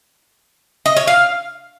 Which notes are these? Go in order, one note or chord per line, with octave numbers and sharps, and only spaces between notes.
D#5
C#5
F5